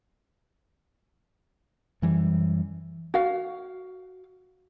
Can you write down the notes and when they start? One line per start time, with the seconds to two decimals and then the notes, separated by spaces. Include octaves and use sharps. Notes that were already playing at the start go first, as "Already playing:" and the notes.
2.02 F#2 E3 G3
3.14 F#4 F5